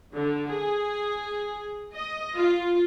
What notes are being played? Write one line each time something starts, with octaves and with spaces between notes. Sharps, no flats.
D3
G#4
D#5
F4